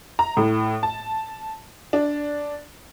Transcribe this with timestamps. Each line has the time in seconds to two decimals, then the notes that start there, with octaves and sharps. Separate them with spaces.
0.19 A#5
0.37 A2
0.83 A5
1.93 D4